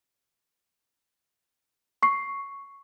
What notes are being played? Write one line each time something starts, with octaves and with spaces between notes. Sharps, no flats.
C#6 C7